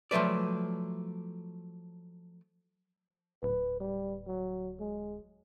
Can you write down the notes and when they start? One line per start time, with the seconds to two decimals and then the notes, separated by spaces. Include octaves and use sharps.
0.11 F3 F#3 A3 B4 D5
3.43 D1 B4
3.80 G3
4.27 F#3
4.80 G#3